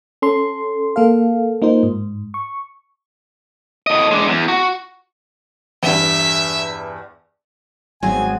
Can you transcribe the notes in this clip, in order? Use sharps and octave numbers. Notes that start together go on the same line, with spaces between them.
C#4 A4 C6
A#3 A4 F5
A#3 D#4 F4 C5
G#2
C#6
A2 D#5
G#3 D4
E2
F#4
E2 G2 E5
G#1 F#3 B3 C4 G#4 G#5